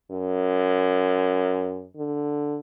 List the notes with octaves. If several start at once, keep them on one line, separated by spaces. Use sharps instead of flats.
F#2
D3